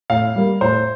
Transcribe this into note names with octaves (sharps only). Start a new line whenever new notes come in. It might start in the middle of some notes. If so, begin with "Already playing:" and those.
A2 F5
G3 A#3
A2 C5